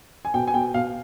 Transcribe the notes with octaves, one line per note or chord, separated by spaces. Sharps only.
G#5
B2 G5
G#5
B2 G5
B2 F5